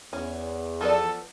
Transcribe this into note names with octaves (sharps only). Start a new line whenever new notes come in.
E2 C#4
F3 B3 A4 D5